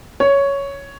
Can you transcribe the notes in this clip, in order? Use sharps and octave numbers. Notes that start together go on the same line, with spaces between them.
C#5